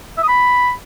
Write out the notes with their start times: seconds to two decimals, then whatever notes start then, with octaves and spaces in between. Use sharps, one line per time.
0.18 E5
0.23 D#6
0.28 B5